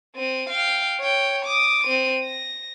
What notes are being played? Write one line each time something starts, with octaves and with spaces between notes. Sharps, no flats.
C4 D#7
F5 G5
C#5 G5
D6 D#6
C4 D#7
A#6